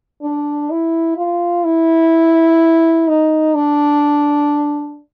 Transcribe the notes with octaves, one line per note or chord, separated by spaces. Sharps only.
D4
E4
F4
E4
D#4
D4